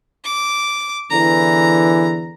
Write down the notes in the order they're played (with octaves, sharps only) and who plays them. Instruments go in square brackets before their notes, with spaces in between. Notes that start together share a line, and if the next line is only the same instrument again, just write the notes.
[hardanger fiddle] D6
[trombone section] E2 D3 E3 [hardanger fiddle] A#5